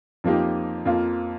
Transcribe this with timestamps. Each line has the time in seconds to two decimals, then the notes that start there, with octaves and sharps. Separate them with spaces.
0.24 F2 F3 A#3 D#4 G4
0.85 F2 F3 A#3 F4